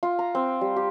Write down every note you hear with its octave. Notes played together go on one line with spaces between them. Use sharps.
F4
A#5
C4
G3
G4